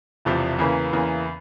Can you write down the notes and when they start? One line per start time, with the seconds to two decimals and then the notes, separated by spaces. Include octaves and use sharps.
0.25 E1 E2 C3 F3
0.59 E2 C#3 E3 A#3
0.93 E2 C#3 E3 A#3